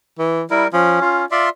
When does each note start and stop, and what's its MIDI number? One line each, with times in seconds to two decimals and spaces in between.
0.19 0.42 52
0.51 0.68 55
0.51 0.65 64
0.51 0.68 70
0.73 0.97 53
0.73 1.25 61
1.02 1.24 65
1.32 1.49 65
1.32 1.47 74
1.32 1.49 76
1.32 1.49 84